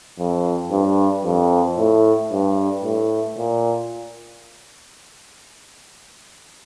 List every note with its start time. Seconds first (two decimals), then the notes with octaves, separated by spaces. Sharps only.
0.18 F2
0.71 G2
1.24 F2
1.78 A2
2.32 G2
2.84 A2
3.38 A#2